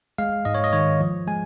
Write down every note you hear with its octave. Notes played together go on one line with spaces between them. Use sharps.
G#3 F5
G#2 D#5
C#5
D#5
D#3 C#5
F3
G#3 G#5